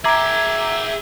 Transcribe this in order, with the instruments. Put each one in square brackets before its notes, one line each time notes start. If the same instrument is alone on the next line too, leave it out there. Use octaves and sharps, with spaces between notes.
[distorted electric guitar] G#4 G5 [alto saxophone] E5 [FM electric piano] A#5 D6 G#6